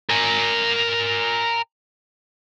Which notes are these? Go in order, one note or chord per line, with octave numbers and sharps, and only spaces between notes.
A#4 G#5